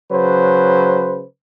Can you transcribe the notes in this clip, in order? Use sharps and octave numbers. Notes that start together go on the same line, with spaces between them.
C#3 F#3 B4 C5